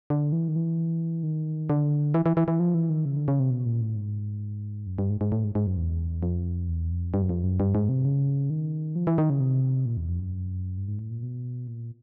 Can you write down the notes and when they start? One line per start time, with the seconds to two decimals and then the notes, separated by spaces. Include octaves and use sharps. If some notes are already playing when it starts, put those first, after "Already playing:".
0.10 D3
0.32 E3
0.48 D#3
0.56 E3
1.23 D#3
1.70 D3
2.14 E3
2.26 E3
2.37 E3
2.48 E3
2.60 F3
2.74 E3
2.90 D#3
3.05 C#3
3.16 D3
3.28 C#3
3.40 C3
3.51 B2
3.66 A#2
3.81 A2
3.96 G#2
4.87 F#2
4.98 G2
5.10 G#2
5.21 G#2
5.32 A2
5.44 G#2
5.55 G#2
5.67 F#2
5.77 E2
6.23 F2
6.69 E2
6.91 F2
7.14 G2
7.22 F#2
7.29 F2
7.44 F#2
7.60 G2
7.75 G#2
7.89 C3
8.05 C#3
8.50 D#3
8.96 F3
9.07 E3
9.18 D#3
9.30 C#3
9.40 C3
9.86 A#2
9.97 E2
10.09 F2
10.20 F#2
10.77 G2
10.88 G#2
10.99 A2
11.11 A#2
11.23 B2
11.67 A#2